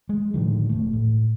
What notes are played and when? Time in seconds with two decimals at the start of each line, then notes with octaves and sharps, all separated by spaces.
0.09 G#3
0.34 A2 D3 D#3 F3
0.69 E1 A3
0.93 A2